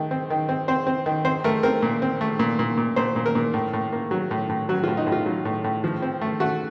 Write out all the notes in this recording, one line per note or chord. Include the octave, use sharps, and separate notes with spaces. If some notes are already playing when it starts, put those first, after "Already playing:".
Already playing: D#3 A3
C4
D#3
C4
C4 C5
C4
D#3
C4 C5
A3 A#4
C4 A#4
A#2
C4
A3
A#2
A#2
A#2
A#2 C5
A#2
A#4
A#2
A2
A2
A#3
F#3
A2
A2
F#3 F#4
F4
A2
D#4
A2
F4
F#3
A2
A2
F3
C4
A3
A3 F#4